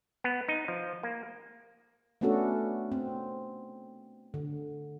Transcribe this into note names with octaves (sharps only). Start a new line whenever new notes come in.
B3
D#4
F3
A#3
A3 B3 C#4 D4 F#4 A4
C4
D3